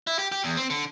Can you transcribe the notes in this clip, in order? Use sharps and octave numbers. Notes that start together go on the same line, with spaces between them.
E4
G4
G4
E2
C4
D3